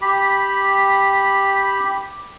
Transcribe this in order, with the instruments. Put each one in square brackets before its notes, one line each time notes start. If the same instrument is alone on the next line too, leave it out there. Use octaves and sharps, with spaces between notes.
[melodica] G4 B5